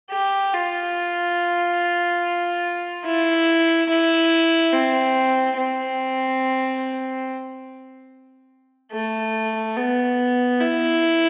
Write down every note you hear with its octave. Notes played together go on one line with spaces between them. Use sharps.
G4
F4
E4
E4
C4
C4
A3
B3
E4